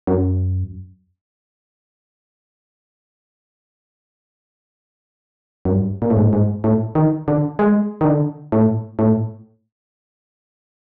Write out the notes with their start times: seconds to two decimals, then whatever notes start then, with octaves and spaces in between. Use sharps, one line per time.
0.07 F#2
5.65 F#2
5.71 G2
6.02 A#2
6.10 A2
6.17 G#2
6.25 A2
6.33 G#2
6.64 A2
6.95 D#3
7.28 D3
7.59 G#3
8.01 D#3
8.05 D3
8.52 A2
8.99 A2